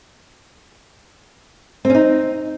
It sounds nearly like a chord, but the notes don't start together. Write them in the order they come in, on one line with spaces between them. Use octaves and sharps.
C4 C#4 D#4